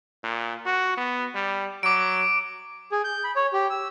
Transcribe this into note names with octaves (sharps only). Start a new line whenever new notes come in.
A#2
F#4
B3
G3
F#3 D6 D7
G#4
G6
B5
C#5
G4
E6